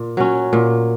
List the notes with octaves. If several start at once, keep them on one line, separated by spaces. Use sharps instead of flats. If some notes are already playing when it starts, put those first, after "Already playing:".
Already playing: A#2
F#3 C#4
A#2